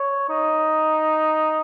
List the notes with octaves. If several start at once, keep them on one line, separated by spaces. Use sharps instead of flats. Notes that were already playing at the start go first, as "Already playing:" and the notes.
Already playing: C#5
D#4